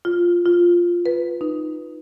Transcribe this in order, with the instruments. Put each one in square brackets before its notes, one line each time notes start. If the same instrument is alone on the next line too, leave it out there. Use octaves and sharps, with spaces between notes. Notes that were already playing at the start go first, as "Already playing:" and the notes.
[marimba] F4
F4
B4
D#4